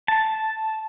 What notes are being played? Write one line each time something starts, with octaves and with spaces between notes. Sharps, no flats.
A5